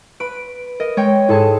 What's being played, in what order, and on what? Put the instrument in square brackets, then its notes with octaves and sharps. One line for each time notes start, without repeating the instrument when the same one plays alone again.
[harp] B4 B5 [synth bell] D7
[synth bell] A#4 [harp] D#5
[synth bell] G#3 [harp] C#5 G5
[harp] G#2 G#4 [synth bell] E4 A4 A5